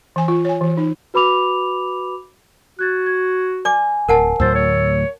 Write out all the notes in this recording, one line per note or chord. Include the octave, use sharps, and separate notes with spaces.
E3 G#5
F4
C#5 G#5
E3
D#4
F#4 B4 B5 D6 F7
F#4 F#6 G#6 A6
G#6
D5 G#5 D6
D1 A#4 F#5 A5
D2 A2 F#3 C5 E6 A6
C#5